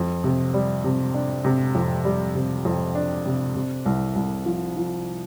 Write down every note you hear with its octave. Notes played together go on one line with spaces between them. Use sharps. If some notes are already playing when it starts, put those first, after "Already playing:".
Already playing: F2
C3
G3
C3
D4
C3
F2
G3
C3
F2
D4
C3
C3
C2
C2
F3
F3